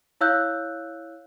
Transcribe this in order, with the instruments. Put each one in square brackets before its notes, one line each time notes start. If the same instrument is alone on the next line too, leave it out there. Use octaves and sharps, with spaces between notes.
[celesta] E4 C#5 F5 E6 F#6 G6